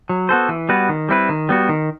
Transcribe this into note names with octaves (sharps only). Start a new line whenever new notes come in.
F#3
B3 F#4 A4 C5
E3
G3 B3 F#4 B4
D#3
G3 C4 E4 B4
D#3
G3 B3 F#4
D#3